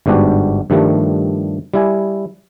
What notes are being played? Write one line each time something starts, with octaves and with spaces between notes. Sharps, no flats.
G1 G#2 B3 D4 F#4 G4
G2 D#3 F3 G3 A3
G3 E4 G#5